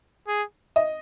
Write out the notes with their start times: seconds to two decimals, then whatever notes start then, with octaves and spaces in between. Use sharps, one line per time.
0.28 G#4
0.76 D#5